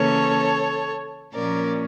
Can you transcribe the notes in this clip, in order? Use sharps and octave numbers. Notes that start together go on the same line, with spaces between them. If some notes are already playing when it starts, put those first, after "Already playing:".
Already playing: C#3 E3 A#3 C#4 A4 C#5
A#2 F3 A#3 C#4 A#4 D5